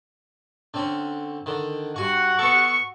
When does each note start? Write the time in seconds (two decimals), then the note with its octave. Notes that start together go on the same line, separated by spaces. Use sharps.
0.74 D3 C4 C#4
1.46 D3 D#3
1.96 G2 F#4 F#5 G#5 C#6
2.39 B3 A4 C#6